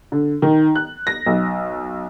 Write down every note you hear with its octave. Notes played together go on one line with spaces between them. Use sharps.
D3
D#3
F#6
A#6
B1